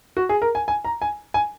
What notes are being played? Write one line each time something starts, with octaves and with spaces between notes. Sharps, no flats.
F#4
G#4
A#4
G#5
G#5
A#5
G#5
G#5